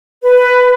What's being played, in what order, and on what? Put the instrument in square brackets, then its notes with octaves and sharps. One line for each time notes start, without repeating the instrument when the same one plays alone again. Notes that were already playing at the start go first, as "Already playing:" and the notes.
[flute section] B4